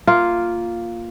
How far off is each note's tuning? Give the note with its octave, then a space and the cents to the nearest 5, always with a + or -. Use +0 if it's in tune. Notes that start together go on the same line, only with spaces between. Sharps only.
A#3 +0 F4 +0